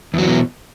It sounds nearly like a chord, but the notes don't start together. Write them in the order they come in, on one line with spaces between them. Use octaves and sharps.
E2 F#3 E3 B2